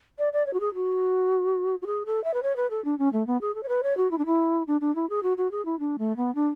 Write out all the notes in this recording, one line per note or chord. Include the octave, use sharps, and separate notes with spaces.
D5
D5
C#5
F#4
G#4
F#4
F#4
G#4
A4
E5
B4
C#5
B4
A4
D4
C#4
A3
B3
G#4
A4
C#5
B4
C#5
F#4
E4
D4
E4
D4
D4
E4
G#4
F#4
F#4
G#4
E4
D4
A3
B3
D4